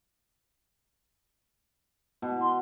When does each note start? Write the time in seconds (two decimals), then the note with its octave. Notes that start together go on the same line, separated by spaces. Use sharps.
2.22 B2
2.41 C6